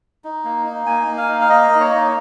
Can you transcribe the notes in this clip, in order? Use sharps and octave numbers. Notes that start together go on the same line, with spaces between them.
D#4
A#3
D#4
A#3 G#5
A#3
F5
D#4
F5
A#3 D#5
A#3
C#5
D#4